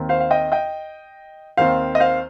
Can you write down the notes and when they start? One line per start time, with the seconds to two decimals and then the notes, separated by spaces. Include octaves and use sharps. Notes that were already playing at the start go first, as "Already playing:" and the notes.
Already playing: D#2 D#3 C4
0.09 C5 F5
0.20 F5
0.31 D#5 G5
0.52 D#5 G5
1.57 D#2 D#3 C4 C5 F5
1.95 D#5
2.00 C5 F5